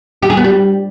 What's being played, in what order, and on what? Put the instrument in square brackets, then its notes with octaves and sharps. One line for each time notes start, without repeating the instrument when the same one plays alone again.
[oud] G4
G#4
B3
G3